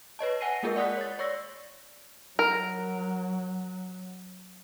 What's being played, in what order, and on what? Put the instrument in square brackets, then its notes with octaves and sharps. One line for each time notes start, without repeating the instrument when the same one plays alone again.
[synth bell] B4 C#5 D#5 A5
F#5 G#5 A#6 C7 D#7
G#3 A#3 F4 G#4 A#4
D5 F#5 D#6 F#6 B6
C#5 A6
C#5 D5 C#6 E6 A#6
[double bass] F#3 [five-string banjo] A#4